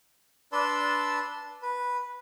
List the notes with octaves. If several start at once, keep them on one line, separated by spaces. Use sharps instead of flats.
D4 B4 D5 A5 C6 E6
B4